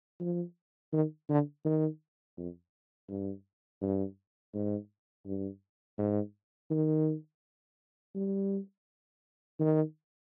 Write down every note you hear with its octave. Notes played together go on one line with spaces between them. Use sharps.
F3
D#3
D3
D#3
F2
G2
G2
G#2
G2
G#2
D#3
G3
D#3